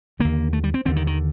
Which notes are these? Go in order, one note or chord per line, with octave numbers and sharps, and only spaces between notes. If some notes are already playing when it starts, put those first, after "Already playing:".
D#2 D3 A#3
A3
G3
C4
D#2 D3 C4
D#3
D#3